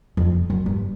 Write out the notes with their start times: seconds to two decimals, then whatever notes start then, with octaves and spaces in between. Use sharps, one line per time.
0.17 F2
0.50 F#2
0.66 G2